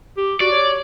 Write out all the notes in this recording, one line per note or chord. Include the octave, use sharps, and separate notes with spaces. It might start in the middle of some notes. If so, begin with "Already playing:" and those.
G4
F#4 D5
C#5